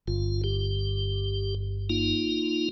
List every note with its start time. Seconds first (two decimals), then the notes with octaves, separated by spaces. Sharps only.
0.08 G1 F4
0.44 G4
1.90 A#3 D#4 F4